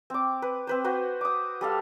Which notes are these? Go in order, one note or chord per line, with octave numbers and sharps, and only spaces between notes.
C4 D6
B4
C4 B4 C5
F#4 B4 C5
D6 D#6
G3 A4 F5